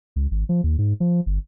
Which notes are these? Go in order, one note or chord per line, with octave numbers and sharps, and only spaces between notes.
C#2
G#1
F3
D#2
G#2
F3
G1